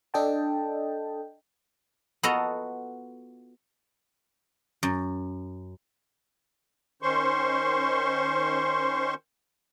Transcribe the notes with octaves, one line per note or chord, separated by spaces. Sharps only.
D4 A4 D#5 G5 A5
B3 F4 F#4 A4 D#5 A#5
F#2
D#3 C#4 C5 C6 C#6